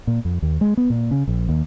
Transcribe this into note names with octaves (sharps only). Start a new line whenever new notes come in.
A#2
F2
D#2
G#3
B3
A#2
C#3
A#1
D#2